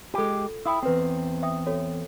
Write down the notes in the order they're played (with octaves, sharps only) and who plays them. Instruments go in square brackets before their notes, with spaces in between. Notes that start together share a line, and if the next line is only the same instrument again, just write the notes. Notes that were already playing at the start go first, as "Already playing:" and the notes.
[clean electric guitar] G#3 G4 [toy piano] F4 A4
[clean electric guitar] E4 [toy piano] G5 D#6 E6
[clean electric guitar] E2 C4 [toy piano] F#4 B4
[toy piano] E5 G5 D#6
F#4 A4 C#5